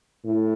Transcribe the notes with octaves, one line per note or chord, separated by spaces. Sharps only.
A2